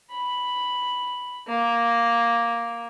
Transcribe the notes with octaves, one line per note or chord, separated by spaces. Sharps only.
B5
A#3